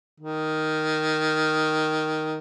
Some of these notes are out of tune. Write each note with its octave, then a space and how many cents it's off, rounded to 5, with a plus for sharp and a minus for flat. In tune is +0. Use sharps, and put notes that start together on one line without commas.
D#3 +0